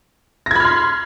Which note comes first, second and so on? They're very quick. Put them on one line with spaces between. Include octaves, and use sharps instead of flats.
A#6 G#6 B5 F6 C6